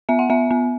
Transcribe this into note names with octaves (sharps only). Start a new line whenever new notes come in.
B3 E5
F#5
B3 E5
B3